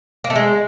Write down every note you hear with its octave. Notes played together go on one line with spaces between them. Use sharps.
A#3
A3
G#3